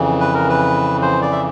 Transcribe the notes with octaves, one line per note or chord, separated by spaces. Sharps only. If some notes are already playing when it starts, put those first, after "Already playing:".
Already playing: F2 C#3 E3
B4
A#4
B4
C5
D5
E5